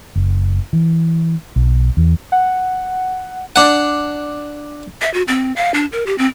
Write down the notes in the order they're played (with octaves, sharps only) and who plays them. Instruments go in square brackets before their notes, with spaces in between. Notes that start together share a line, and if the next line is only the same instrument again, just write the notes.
[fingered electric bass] F#1
E3
B1
E2
[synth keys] F#5
[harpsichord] D4 F#5
[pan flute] E5
F#4
C4
F5
D4
A#4
G4
C4